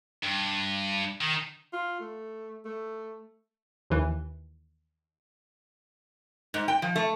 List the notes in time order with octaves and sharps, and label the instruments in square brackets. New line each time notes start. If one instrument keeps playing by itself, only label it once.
[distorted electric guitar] G2
D#3
[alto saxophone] F4
A3
A3
[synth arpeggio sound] D#2 E3
[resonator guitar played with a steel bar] G#2
G5
F3
A3